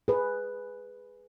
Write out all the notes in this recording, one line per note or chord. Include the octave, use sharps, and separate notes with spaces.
G#4 B4